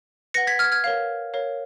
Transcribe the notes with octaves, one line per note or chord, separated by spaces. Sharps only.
B4 F#5 A#6 C#7
G#6 B6
F6 G#6
F6 G#6
A#4 C#5 F5
A#4 C#5 F5